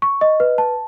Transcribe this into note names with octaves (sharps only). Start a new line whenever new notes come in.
C#6
D#5
B4
A5